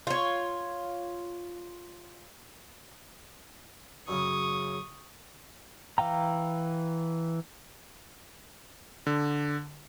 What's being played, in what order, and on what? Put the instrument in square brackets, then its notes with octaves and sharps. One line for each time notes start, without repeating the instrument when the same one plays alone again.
[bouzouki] F4 C#5
[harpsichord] F#2 C#3 [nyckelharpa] C#6 D#6
[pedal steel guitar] E3 F5 G5 A#5
[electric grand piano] D3